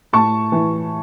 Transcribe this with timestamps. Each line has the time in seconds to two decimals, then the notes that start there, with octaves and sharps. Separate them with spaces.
0.13 A2 A5 C#6
0.52 E3